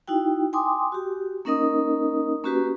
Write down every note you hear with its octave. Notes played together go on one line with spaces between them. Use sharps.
D#4 E4 F#4 G5
G5 G#5 C6 D6 D#6
F#4 G4
A#3 C#4 D#4 A#4 D#5 D#6
A#3 C#4 F#4 G4 B4